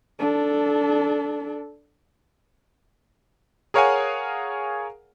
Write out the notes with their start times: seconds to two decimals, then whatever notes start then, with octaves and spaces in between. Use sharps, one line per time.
0.19 D4 A4
3.74 G#4 A#4 C#5 F5 F#5 G#5